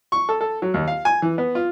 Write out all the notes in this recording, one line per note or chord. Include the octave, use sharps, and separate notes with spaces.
C#6
A4
A4
F#3
D#2
F5
G#5
E3
B3
F4